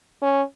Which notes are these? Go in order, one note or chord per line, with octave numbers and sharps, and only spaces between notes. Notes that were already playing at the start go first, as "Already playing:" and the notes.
C#4